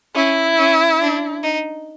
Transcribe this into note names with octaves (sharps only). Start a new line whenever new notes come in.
C#4 E4
C#4
D4
D#4